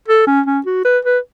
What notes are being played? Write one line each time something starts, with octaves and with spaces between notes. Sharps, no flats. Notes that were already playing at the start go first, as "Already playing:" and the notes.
A4
C#4
C#4
F#4
B4
B4